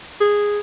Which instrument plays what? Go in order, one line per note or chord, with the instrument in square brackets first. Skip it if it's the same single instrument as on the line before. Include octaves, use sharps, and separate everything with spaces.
[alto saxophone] G#4